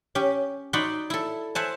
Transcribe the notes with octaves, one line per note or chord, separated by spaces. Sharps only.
C#4 G4
D#4 F#4 D5 F#5 B5 C6
E4 A4
C5 E5 F#5 G#5 A5